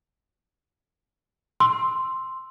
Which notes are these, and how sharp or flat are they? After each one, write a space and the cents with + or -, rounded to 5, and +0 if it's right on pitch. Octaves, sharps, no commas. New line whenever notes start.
C6 +0 E6 +0